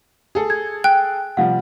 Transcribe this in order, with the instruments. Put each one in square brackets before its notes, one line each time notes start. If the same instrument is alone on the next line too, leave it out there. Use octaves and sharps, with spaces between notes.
[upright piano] G#4 A4
[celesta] G#6
[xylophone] G5 [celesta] F#6
[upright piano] C3 F3 G3 [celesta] F5 F#5